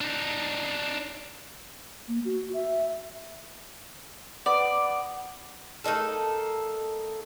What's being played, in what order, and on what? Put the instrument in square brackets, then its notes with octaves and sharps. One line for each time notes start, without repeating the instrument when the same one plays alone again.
[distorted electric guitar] D4 D#4
[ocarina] A#3
F#4
E5
[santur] B3 [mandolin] D5
[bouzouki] A3 A#3 D#4 A4